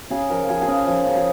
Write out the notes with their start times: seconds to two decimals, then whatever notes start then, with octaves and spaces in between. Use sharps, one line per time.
0.10 C#3 G#4
0.30 F3 A#4
0.49 F3 G#4
0.61 G#4
0.68 C#3 A#4
0.87 F3
1.07 C#3
1.16 G#4